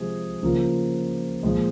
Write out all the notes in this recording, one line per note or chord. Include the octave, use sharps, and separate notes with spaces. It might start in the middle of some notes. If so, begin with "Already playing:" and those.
Already playing: C3 F3 G#3 G#4
C#3 F3 A#3 F4
A#2 F3 G#3